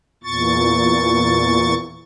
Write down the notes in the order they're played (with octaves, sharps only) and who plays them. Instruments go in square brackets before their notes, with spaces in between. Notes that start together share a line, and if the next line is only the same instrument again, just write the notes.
[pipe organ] E2 A#2 C#6 A6